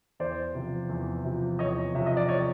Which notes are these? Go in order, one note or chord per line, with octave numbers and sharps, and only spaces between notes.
E2 C5 D5
C3 F3
E2
C3 F3
E2 C#5 D#5
C3 F3 E5
D#5
D5
C#5 D#5